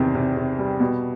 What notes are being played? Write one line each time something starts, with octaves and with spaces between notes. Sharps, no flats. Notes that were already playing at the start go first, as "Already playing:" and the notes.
Already playing: E2 C3 D#3
C3
C3
G3
B2